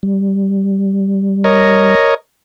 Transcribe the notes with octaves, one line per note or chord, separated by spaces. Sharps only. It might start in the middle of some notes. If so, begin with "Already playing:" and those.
G3
A#4 C#5 D#5